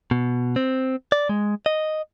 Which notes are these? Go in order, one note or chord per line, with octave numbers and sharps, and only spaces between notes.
B2
C4
D5
G#3
D#5